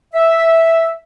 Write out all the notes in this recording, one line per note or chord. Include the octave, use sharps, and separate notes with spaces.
E5